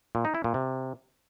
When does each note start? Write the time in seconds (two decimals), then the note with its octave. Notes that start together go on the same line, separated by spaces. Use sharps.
0.15 A#2
0.25 D#4
0.35 E4
0.44 A#2
0.54 C3